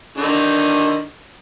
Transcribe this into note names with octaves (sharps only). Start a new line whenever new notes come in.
D3 D#3 D#4